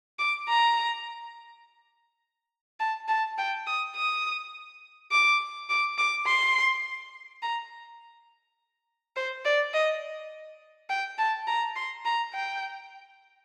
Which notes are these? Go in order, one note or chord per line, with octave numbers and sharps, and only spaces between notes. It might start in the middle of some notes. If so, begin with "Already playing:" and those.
D6
A#5
A5
A5
G5
D#6
D#6
D6
D6
D6
C6
A#5
C5
D5
D#5
G5
A5
A#5
C6
A#5
G5